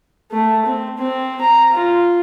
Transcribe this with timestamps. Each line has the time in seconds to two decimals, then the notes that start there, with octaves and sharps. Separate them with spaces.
0.31 A3
0.65 C4
0.98 C4
1.41 A#5
1.73 F4